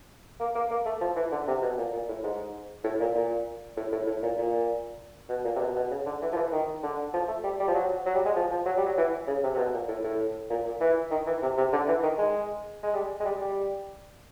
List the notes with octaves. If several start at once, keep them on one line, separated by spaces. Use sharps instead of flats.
A#3
A#3
A#3
A3
F3
E3
D3
C3
B2
A#2
A#2
A2
G#2
A2
A#2
A#2
A2
A2
A2
A#2
A#2
B2
A#2
C3
B2
B2
C#3
D3
E3
F3
E3
D#3
D3
F3
A3
G3
G3
F3
F#3
F#3
G3
G#3
F3
F3
F#3
G3
F#3
E3
C#3
C3
C3
B2
A#2
A2
A2
A#2
A#2
E3
D#3
E3
C3
C3
D3
E3
D#3
G#3
G#3
G3
G#3
G3
G3